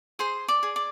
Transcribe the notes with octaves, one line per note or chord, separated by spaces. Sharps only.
G#4 C5 C6
D5 D6
G#4
D5